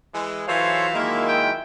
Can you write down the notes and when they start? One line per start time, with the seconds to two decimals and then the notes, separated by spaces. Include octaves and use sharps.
0.14 E3 G#3
0.48 E3 F#3 F4 A4 C5 C#5 E5 F5
0.93 D#3 G#3 A#3 E4
1.29 G5